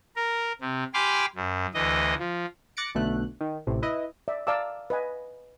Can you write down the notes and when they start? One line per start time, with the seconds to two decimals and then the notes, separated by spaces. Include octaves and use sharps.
0.16 A#4
0.61 C3
0.94 G4 G#5 B5 C6 D6 F6
1.35 F#2
1.74 D2 E3 D#5
2.19 F3
2.77 D6 F#6 A6 A#6 C#7 D7
2.95 B1 B2 D3 A3 F#6
3.41 D#3
3.67 A1 A2 C3
3.82 E4 B4 D#5
4.28 D5 E5
4.47 D5 F5 A5 A#5 D6 E6
4.90 B4 D#5 G#5